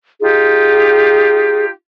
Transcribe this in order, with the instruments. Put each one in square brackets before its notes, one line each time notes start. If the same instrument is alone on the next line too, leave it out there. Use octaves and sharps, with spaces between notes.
[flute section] D#4 F4 G4 [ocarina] G#4